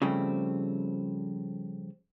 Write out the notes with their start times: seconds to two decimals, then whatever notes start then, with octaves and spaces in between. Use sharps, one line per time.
0.02 C#3 F3 G3 A3 C4